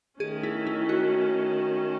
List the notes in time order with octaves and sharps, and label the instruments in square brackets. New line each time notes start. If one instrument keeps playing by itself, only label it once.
[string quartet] D#3 A3 C#4 [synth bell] G#4
[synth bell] E4
E4
F#4